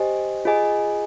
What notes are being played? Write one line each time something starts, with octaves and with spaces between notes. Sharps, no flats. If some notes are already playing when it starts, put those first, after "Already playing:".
Already playing: G4 C5 D#5 G#5
F4 G#4 D#5 G#5